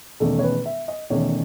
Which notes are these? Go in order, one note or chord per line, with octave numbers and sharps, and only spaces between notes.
E1 E2 D#3 A3 C#4 A4
C#5
B4
E5
D#5
E1 E2 D#3 A3 C#4 C#5